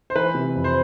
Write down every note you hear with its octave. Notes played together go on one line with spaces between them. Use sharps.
C5
E3 B4
C3
F2
C5